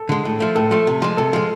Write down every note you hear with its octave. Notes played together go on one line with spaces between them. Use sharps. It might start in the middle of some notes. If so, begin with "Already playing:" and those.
Already playing: A4
D3 G#3
A2
F3 A3
A2 A4
F3 A3
C3
F3 G#3
C3 A4
F3 G#3